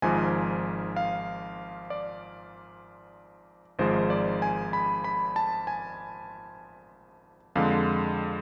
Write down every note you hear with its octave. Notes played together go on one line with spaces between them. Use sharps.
G#1 G#2 F3 G#5
F5
D5
G#1 G#2 F3 G#3 C5
D5
G#5
B5
B5
A5
G#5
F2 D3 G#3 F5